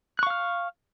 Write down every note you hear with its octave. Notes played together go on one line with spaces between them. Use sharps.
F5 C#6 F6 F#6